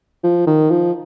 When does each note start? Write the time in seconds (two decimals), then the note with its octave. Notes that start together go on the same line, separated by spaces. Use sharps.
0.24 F3
0.47 D#3
0.71 F3